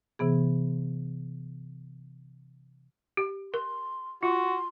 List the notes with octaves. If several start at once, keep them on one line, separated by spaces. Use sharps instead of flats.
C3 E3 B3 G#4
G4
A#4 C6
F4 F#4 C6